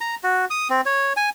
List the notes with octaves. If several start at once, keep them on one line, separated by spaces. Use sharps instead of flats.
A#5
F#4
D#6
C4
C#5
G#5